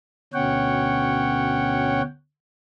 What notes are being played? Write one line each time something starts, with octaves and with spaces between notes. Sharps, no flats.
D2 B2 C#4 C#5 F#5 G5